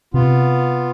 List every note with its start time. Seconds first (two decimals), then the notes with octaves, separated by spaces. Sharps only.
0.14 C3 B3 F4